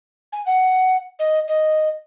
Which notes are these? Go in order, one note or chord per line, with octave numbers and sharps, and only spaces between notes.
G#5
F#5
D#5
D#5